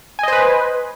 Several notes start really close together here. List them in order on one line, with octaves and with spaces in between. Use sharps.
G#5 D#5 C5 B4